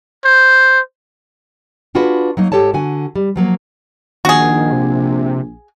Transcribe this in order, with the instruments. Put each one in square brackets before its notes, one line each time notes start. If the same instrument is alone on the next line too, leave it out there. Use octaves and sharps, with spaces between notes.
[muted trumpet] C5
[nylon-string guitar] D4 F4 F#4 G#4 B4
F#3 A#3 D#4
G#2 E3 G4 A4 C#5 A5
D3 F#4 G#5
G3
F3 F#3 A#3
[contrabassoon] A#1 [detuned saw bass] D#3 [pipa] F#4 G#4
[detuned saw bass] C3